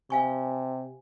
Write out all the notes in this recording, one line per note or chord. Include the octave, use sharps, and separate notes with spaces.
C3 F5 G#5 C#6